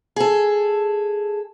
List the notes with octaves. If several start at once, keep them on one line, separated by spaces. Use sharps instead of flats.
G#4 A4